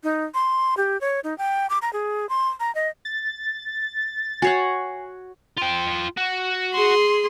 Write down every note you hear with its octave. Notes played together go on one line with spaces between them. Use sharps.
D#4
C6
G4
C#5
D#4
G5
D6
A#5
G#4
C6
A#5
D#5
A6
F#4 C#5 F#5 G#5 C7
F4 G5
F#4
G#4 C6